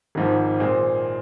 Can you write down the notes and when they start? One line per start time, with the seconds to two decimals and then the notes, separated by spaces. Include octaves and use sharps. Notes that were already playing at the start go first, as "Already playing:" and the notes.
0.15 G#1 G#2 F3
0.60 A#2 G#3 C4